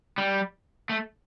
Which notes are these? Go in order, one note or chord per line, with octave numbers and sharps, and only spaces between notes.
G3
A3